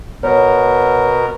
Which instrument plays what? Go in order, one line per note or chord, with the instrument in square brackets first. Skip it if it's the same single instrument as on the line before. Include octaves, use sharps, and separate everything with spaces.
[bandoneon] B2 B3 A#4 [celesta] C#5